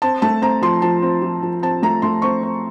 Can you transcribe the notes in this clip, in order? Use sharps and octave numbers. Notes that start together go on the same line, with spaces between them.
C4 A5
A3 A5
C4 A#5
F3 C6
F3 A5
C4
F3
F3
C4 A5
A3 A#5
A3 C6
C4 C#6
C4